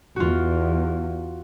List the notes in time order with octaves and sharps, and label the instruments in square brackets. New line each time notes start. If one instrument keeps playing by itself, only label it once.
[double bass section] E2 [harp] F4 F#4